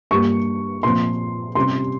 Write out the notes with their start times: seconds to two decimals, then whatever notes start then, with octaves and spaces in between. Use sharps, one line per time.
0.11 G2 G3 A#3 C#6
0.83 A#2 F3 C4 C6
1.55 C3 G3 C#4 C6